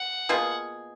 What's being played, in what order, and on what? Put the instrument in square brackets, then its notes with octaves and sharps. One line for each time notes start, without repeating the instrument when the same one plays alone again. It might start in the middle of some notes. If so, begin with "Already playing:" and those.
Already playing: [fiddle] F#5
[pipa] B2 A#3 F4 G#4